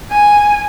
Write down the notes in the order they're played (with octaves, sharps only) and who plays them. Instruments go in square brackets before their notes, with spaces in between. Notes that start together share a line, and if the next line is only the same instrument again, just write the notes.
[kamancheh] G#5